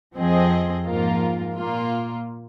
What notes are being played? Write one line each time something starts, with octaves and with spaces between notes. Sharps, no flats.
F2 F3 C4 G#4 D#5
G#2 F3 A#3 F4 A#4
A#2 A#3 F4